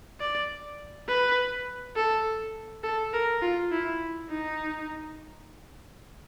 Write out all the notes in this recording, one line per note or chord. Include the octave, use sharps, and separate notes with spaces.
D5
B4
A4
A4
A#4
F4
E4
D#4